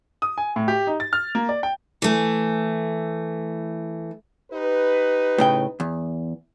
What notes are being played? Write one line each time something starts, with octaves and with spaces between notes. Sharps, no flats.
D#6
G#5
A2
G4
D#4
A6
F6
A#3
D5
G5
E3 A3
D#4 G4 B4
A2 C#3 G5
E2